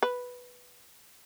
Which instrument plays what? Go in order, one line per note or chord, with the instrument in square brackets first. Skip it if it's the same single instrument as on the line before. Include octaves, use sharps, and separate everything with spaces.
[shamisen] B4